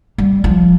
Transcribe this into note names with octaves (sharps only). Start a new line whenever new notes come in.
G3
F3